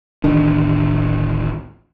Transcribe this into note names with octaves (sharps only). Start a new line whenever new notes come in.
D1 A1 D#3 D4